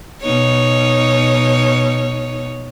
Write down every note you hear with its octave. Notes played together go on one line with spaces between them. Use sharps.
B2 D#4 C#5